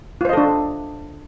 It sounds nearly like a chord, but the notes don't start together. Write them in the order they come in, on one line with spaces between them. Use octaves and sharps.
F4 C5 D#5 A4 D4